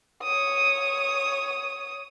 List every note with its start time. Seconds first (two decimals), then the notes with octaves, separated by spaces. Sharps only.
0.23 C#5 D#6